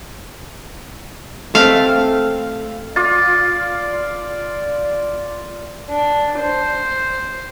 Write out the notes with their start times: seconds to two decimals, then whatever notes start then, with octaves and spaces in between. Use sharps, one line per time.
1.55 A3 C4 F5
2.96 F4 D5 D6 A6
5.89 D4
6.38 C5